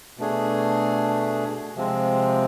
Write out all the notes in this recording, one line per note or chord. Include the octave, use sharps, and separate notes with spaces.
B2 A3 D4 G#4
C3 F3 G#3 C4